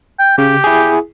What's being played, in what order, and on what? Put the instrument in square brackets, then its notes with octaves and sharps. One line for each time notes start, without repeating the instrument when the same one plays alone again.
[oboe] G5
[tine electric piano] C#3 [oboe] G4
[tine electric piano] E4 G#4